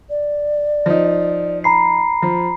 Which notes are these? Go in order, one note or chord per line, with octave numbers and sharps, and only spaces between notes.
D5
F3 D#4
A#5 B5 C7
F3